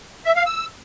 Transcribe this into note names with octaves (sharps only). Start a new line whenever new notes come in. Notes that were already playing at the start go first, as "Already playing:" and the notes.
E5
F5
E6